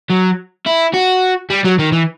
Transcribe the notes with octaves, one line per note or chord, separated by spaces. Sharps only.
F#3
E4
F#4
G3
F#3
D#3
E3